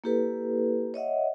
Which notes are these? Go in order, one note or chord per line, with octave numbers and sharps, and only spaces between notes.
A#3 E4 G4 A4 B4
C#5 D#5 E5 F#5